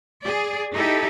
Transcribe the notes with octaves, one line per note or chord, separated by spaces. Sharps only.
G#4 D5
D#4 E4 G4 A4